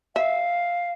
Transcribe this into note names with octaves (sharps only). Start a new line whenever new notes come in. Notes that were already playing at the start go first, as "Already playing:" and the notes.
E5 F5